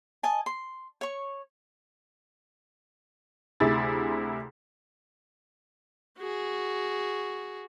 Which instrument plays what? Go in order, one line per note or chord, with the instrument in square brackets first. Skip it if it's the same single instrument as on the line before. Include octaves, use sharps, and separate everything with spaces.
[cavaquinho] D#5 G#5 A5
C6
C#5 C#6
[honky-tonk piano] D2 C3 E4 G#4 A6
[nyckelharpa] F#4 G#4